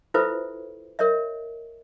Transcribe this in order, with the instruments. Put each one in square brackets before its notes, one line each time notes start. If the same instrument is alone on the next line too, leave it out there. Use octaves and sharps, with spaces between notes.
[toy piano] E4 F4 A4 B4 C5 E5
A#4 C#5 D#5 E5